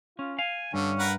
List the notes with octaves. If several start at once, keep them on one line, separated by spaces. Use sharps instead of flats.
C#4 F4
F5 G#5
G2 D3 C#4
A#4 B4 F#5